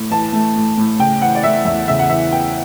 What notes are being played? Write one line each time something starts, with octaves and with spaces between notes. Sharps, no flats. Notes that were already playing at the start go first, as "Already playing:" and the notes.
Already playing: A2
E3 A5
A3
A2
A2
C#3 G5
E3 F#5
D5
A3 E5
E2 E5
C#3 E5
F#5
E3 E5
B3 G5